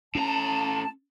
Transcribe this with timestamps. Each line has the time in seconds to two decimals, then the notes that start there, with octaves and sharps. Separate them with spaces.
0.15 A2 C#4 A5 A#5